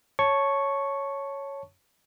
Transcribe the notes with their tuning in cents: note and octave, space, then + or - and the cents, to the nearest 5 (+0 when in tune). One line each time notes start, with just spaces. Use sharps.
C#5 +0 A5 +0 C#6 +0